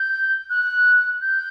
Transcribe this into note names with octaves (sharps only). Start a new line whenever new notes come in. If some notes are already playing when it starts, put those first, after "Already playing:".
Already playing: G6
F#6
G6